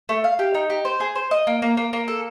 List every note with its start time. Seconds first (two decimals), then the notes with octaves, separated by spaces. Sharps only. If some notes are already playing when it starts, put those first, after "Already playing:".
0.09 A3
0.24 F5
0.39 G4
0.55 D#4
0.70 G4
0.85 C5
1.00 G#4
1.15 C5
1.31 D#5
1.47 A#3
1.62 A#3
1.77 A#3
1.93 A#3
2.08 A4